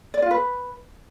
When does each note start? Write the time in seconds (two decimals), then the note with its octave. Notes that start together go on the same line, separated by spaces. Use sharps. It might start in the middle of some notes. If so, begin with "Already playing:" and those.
0.14 D5
0.22 F4
0.31 B4